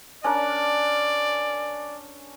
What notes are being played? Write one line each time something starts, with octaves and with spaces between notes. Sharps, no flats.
C#4 D4 A#4 D5